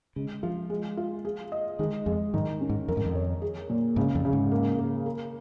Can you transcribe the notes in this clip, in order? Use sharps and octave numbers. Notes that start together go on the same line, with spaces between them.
C#3 G#3
F3 F4
G#3
F4
G#4
D#5
D#3 G#3
F2 G#3
G#2 D#3
C#4
G#2
F2 A#4
G#2
F2
C#5
G#4
A#2
G#2 C#3
F2
C#3
G#2
A#3
A#3
A#4